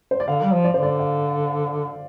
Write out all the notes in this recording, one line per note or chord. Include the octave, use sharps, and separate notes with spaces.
C5
D5
D3 F5
G3
F3
D5
D3 C5
D5
F5